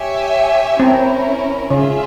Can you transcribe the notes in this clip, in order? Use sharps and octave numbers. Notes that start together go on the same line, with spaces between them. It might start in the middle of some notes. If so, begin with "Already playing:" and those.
Already playing: G4 C#5 E5 G#5
C4 C#4 E4 A#4
C#3 F4 G#4 E5